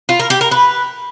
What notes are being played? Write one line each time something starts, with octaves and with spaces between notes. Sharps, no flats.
F4
A#4
G4
A#4
B4